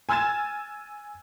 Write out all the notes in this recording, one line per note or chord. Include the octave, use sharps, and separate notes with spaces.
G#5 E6 F6 G#6 A6 E7